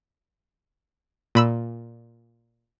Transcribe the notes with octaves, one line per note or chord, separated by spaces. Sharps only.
A#2 B5 E6